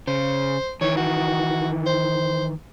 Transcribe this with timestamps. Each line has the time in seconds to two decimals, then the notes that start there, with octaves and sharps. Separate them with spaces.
0.07 C#3 C5
0.81 D#3 E3 C#5
0.97 F#4
1.87 C5